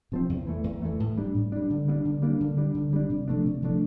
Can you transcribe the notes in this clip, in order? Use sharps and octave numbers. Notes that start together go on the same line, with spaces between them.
C3 F3 C4
E2
E3 A3
E2
E3 A3
A2
G3 D4
A2
G3 D4
D3
G3 A#3 D4
D3
G3 A#3 D4
D3
G3 D4
D3
G3 D4
C3
F3 A3 D4
C3
F3 A3 D4